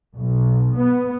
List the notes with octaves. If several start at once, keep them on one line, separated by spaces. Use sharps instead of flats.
B1
B3